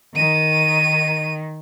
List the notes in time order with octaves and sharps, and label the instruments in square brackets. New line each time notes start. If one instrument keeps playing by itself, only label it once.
[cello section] D#3 [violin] D#7